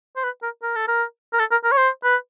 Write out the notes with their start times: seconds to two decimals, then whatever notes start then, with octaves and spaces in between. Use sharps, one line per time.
0.16 C5
0.24 B4
0.43 A#4
0.63 A#4
0.76 A4
0.88 A#4
1.34 A#4
1.39 A4
1.52 A#4
1.64 A#4
1.72 C#5
1.77 C5
2.04 B4